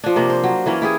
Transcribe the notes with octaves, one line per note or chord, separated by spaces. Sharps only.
F3 D4
C3 A#3
C5
F#3
E3 A#3 C#4
E4 G4 G#4